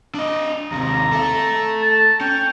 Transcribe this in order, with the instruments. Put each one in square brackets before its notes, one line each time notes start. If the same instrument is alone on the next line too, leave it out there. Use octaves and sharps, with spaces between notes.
[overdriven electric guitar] D4 D#5
[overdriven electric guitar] D#2 C3 [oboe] A#5
[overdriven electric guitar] A4 E5
[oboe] A5
[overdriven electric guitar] C#4 [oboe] G5